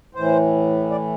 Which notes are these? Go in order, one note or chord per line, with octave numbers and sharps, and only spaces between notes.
A2 E3 C5
D5